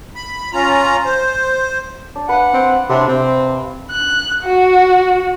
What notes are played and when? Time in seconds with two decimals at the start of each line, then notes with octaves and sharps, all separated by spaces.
0.15 B5
0.53 C#4 F4 A#5
1.05 C5
2.15 D4
2.29 B4 F5 F#5
2.54 C4
2.90 A2 C3 C4 D4 G5
3.08 C3 C4
3.91 F#6
4.45 F#4